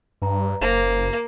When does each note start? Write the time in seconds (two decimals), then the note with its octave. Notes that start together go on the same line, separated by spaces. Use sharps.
0.22 G2 B4 A#5
0.61 F#1 A#3 A#4 C5 F5